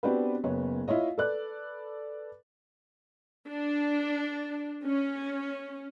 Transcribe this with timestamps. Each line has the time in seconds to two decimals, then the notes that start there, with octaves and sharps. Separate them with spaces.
0.03 B3 C4 D4 F#4 G4 B4
0.44 F#1 B3 C#5
0.88 E4 F4 C#5 D#5
1.18 A4 B4 D5 F#6
3.49 D4
4.85 C#4